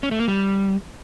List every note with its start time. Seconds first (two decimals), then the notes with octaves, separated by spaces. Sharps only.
0.03 C#4
0.11 A3
0.20 A#3
0.28 G3